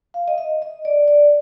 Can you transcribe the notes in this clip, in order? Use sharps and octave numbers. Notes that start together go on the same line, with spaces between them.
F5
D#5
E5
D#5
D5
D5